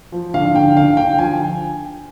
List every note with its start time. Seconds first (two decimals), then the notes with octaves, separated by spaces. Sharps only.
0.12 F3
0.34 D3 F5
0.54 D3 G5
0.76 D3 F5
0.97 D3 G5
1.19 F3 G#5